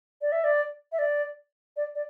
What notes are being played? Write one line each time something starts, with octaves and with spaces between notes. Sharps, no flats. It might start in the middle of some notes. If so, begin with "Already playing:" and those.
D5
E5
D5
E5
D5
D5
D5